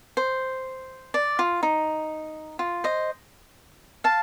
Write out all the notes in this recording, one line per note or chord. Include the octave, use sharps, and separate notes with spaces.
C5
D5
F4
D#4
F4
C5 D#5
F5 A5